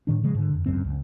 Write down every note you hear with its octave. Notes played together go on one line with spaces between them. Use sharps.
A2 D#3 D4
C#3 F3 G#3
G#2 D3
F2
G#1 C#2 F#2 C4
C#2